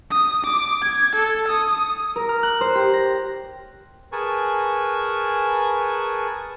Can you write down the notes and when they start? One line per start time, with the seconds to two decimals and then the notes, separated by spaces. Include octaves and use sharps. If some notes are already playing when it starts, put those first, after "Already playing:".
0.11 D#6
0.45 D6
0.82 G#6
1.16 A4
1.48 D#6
2.16 A#4
2.29 F6
2.43 F#6
2.61 C5
2.75 G4
2.93 A#6
4.12 G#4 A#4 B4 G#5 A5 C#6